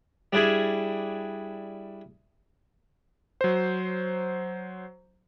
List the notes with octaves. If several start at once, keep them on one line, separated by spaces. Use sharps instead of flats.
G3 D4 E4 G#4
F#3 C5